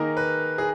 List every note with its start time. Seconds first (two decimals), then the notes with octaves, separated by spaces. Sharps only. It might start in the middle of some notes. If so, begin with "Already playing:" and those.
Already playing: D#3 A#3 D#4 G#4 A#4
0.17 B4
0.58 G#4